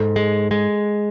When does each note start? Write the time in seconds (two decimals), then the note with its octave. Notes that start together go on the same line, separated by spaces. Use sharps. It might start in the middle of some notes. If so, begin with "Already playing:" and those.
Already playing: G#2 A4
0.16 G#3
0.51 G#3